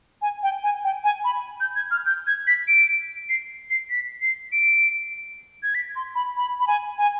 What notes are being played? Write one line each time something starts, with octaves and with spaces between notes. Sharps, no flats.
G#5
G5
G#5
G5
G#5
B5
G6
G#6
F6
G6
G#6
B6
D7
C7
C7
B6
C7
D7
G#6
B6
C6
B5
B5
B5
G#5
G#5